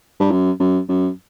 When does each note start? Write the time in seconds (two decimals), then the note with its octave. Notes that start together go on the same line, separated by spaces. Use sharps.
0.20 G2
0.31 F#2
0.60 F#2
0.89 F#2